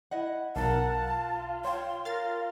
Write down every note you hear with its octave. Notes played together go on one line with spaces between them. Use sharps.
E4 D#5 F#5
B1 A#4 F5 F#5 A5
F4
C#5 G5 C6
F4 A#4 F5 A6